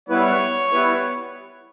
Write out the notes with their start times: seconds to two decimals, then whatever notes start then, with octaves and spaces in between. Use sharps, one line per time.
0.09 G3 B3 E4 B4 C#5
0.72 G3 B3 E4 B4